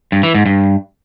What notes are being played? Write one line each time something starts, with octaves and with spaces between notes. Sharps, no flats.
G2
E3
G#2
G2